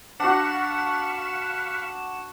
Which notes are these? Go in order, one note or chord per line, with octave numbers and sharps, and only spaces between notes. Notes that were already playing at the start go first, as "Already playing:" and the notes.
D4 F#4 F5 F#5 B5 C#6 E7